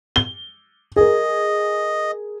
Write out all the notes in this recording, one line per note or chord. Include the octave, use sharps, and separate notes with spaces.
G7
G#4 A#4 D#5